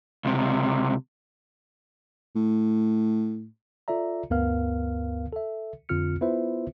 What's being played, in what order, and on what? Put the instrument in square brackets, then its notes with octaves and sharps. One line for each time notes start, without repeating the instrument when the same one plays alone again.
[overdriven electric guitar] C#2 C3
[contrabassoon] A2
[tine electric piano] F4 A4 D5 E5 A#5
D2 G2 B3 A#4 F5 F6
A4 E5
F2 D3 C4 F4 F6 C#7
B3 E4 F4 B4 C5 E5